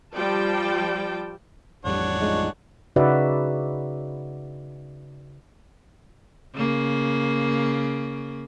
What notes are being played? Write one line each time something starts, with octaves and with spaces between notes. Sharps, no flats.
F3 G3 D5 G5 A5
A1 F2 G3 D4 C#5 F#5
G#3 D#4 F4
C#3 D#4 F#4 B4 D5 E5
C#3 A#3